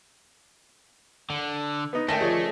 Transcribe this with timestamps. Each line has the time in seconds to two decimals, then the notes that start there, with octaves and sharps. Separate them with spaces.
1.30 D3
1.93 B3 D#4
2.09 D2 D#3 A3 C#4 G5 A5 A#6
2.21 F3 G#4 C#5 D5